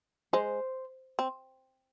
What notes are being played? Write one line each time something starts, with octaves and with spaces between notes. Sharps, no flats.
G#3 C5
C4